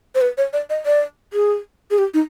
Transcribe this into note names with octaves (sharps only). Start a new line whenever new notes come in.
C5
B4
C#5
D5
D#5
D5
G#4
G#4
G4
D#4